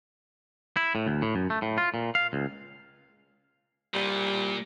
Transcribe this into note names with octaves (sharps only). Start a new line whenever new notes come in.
E4
A2
D2
A2
F#2
A3
A2
F4
A#2
F5
C#2
A#2 G3